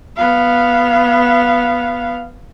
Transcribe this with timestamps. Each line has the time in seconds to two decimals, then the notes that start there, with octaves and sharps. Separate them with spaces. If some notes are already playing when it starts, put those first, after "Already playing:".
0.17 B3 F5